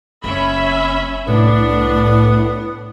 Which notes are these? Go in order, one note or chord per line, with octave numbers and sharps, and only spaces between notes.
F#1 C#4 E5 B5
C2 A2 B3 D4